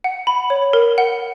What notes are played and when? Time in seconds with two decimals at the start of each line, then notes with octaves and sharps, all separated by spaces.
0.04 F#5
0.27 B5
0.50 C#5
0.73 A#4
0.98 F#5